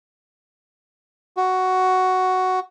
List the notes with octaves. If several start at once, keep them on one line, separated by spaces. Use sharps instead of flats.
F#4